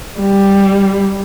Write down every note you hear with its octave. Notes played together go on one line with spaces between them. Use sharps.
G3